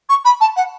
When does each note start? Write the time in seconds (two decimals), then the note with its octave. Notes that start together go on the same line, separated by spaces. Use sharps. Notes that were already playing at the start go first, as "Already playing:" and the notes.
0.09 C#6
0.25 B5
0.40 A5
0.56 F#5